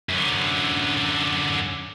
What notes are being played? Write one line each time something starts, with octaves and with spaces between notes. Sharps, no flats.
F#2 D3